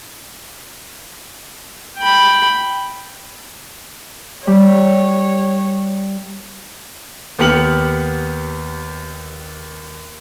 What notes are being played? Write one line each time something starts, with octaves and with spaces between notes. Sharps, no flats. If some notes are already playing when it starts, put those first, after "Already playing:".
G5 B5
G3 C#5
D#2 B3 G4 F6 C#7 F#7